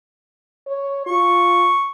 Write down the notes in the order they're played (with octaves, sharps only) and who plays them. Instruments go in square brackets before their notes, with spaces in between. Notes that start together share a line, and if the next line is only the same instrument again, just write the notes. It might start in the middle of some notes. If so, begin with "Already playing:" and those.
[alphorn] C#5
[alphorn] F4 [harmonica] C#6